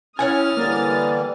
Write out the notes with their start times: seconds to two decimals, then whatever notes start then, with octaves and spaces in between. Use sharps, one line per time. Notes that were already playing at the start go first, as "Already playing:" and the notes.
0.19 C#4 E4 C#5 F#5 G#5 D#6 F6 A6
0.57 D3 E3 G3 A#3 A#4